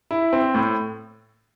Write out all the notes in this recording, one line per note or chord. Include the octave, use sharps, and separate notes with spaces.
E4
C4
A2